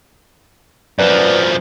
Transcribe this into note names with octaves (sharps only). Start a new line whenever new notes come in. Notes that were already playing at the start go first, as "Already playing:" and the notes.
F#2 F3 B4 D5